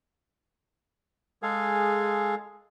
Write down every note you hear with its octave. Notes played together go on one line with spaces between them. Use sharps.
G#3 G#4 A4 F5